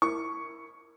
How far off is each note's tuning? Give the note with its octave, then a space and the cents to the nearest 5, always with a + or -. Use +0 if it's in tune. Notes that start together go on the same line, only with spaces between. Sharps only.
E4 +0 A#4 +0 C#6 +0